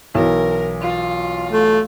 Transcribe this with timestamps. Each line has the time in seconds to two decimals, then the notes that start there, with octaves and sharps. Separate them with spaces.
0.15 B1 E3 A#4
0.81 F4
1.51 A3